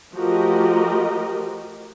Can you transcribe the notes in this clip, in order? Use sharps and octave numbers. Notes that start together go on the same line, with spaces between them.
F3 A3 F#4 G4 A#4 D#5